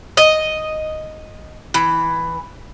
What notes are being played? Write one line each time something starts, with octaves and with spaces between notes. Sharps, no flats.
D#5
E3